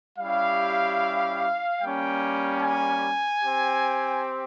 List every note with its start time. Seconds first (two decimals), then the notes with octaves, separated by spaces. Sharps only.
0.18 G3 C#4 E4 G4 F5
1.80 G3 A#3 C#4 G5
2.62 G#5
3.43 C4 G4